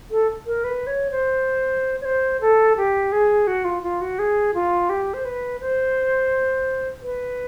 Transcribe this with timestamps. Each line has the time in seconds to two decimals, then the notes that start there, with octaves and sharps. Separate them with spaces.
0.11 A4
0.46 A#4
0.64 B4
0.87 C#5
1.11 C5
2.01 C#5
2.05 C5
2.41 A4
2.77 G4
3.12 G#4
3.47 F#4
3.65 F4
3.83 F4
4.01 F#4
4.19 G#4
4.54 F4
4.89 G4
5.14 C5
5.25 B4
5.60 C5
7.02 B4